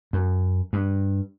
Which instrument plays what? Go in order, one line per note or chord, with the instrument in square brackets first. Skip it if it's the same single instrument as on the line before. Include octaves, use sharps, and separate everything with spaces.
[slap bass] F#2
G2